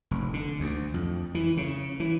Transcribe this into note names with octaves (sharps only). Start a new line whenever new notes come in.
F1
D3
D2
F2
E3
C#3
E3